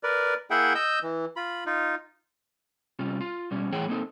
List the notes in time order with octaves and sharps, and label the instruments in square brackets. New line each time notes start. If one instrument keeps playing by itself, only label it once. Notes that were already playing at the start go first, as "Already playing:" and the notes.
[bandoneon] A#4 B4 D5
A#3 E4 G#4 E5 F#5 G5
D#5 E6 G6
E3
F4 B5
D#4 F4
[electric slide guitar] C3 G3 C#4 F4
F4
B2 G3 C#4
A2 E3 G#4 C#5 F#5 G5
A#3 C4 D#4 A4